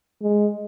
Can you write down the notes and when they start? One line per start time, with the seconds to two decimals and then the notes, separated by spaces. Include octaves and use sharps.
0.23 G#3